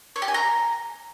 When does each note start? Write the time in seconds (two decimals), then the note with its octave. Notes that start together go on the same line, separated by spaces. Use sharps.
0.16 C#5
0.22 G4
0.28 G#5
0.34 A#5